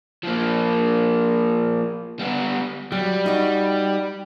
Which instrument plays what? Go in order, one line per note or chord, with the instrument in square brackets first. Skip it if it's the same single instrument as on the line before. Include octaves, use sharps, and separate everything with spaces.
[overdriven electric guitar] F3 A#3
G3 B3
[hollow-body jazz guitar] F#3 [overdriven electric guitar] G3
[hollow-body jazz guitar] D#4 F#4